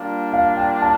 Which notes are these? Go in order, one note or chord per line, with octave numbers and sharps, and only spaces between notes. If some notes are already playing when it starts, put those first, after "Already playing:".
Already playing: G3 A#3 D4 F4 F5
F5
G5
A5